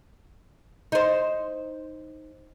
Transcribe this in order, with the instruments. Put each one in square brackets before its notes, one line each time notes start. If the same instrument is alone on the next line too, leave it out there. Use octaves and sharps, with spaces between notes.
[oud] D#4 C5